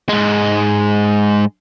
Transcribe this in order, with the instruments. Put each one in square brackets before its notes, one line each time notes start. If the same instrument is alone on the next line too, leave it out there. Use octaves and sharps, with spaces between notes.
[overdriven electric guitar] G#2 G#3